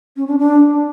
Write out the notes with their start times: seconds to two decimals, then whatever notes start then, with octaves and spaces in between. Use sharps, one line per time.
0.17 C#4
0.28 D4
0.38 D4